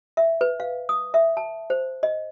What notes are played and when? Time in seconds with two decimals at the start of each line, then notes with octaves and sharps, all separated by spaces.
0.17 E5
0.41 B4
0.60 F5
0.89 D#6
1.14 E5
1.37 A5
1.70 C5
2.03 D#5